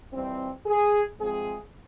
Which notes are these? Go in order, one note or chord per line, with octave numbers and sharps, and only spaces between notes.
F2 E3 G3 C4
G#4
C3 F3 G#3 C4 G#4